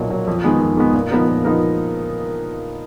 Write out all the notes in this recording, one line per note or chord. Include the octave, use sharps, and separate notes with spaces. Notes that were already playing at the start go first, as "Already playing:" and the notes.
Already playing: B1 A#2 F#3
A#2 F#3
F2
D#3 G#3 B3
F2
D#3 G#3 B3
A#2
F3 B3 D#4 A#4
A#2
F3 B3 D#4 A#4